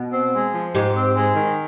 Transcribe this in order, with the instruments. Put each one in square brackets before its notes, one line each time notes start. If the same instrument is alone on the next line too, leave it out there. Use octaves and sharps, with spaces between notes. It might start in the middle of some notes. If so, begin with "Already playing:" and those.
Already playing: [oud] B2
[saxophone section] C4
G#3
F3
[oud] G#2 [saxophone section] G4
[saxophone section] C4
G#3
D#3